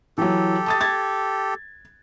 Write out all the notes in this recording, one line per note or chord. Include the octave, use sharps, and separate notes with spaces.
E3 F#3 G4 A4
A5 D#6 A6
G#6 A6